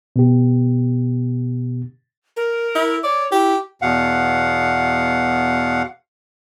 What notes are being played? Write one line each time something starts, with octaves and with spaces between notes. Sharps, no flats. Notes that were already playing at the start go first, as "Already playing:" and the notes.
B2 B3 G4
A#4
E4
C#5 D5
E4 G4
E2 B2 F5 F#5